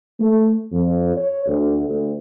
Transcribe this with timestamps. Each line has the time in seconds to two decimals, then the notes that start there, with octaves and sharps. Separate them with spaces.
0.20 A3
0.72 F2
1.16 C#5
1.47 D2
1.89 D2